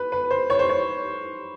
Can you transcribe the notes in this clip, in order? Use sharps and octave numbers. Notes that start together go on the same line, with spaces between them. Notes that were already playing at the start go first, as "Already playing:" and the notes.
Already playing: B4
B4
C5
C#5
C5
C#5